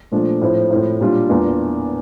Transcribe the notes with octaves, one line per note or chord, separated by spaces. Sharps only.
A#2 F3 A3 D4
A2 F3 C4 E4
A2 F3 C4 E4
A#2 G3 D4 F4
E2 E3 A#3 D4 F4